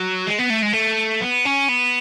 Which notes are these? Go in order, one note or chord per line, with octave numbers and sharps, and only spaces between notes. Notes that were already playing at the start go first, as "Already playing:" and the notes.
Already playing: F#3
G#3
B3
A3
G#3
A3
B3
C#4
B3